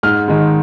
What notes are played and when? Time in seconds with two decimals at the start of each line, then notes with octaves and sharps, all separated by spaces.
0.03 G#2 F6
0.28 D#3 G#3